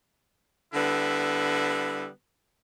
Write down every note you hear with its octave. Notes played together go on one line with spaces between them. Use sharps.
D3 G3 B3 E4